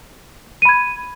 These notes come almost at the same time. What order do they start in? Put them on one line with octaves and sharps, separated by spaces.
D#7 B5 G#6